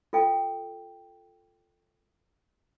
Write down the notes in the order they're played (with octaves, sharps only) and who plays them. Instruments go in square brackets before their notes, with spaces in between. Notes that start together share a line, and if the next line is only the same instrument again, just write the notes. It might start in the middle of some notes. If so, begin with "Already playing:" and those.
[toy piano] F4 A4 G5